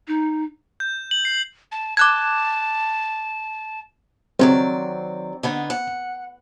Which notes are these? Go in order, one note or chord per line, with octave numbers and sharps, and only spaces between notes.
D#4
G6
F#7
C7
A5
A5 D6 F#6 G#6
D#3 F#3 C4 D5
D3 B3 D#4
F#5